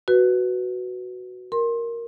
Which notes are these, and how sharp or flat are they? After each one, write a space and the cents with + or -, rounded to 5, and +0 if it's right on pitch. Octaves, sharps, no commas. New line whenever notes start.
F#4 +0 B4 +0
A#4 +0 C6 +25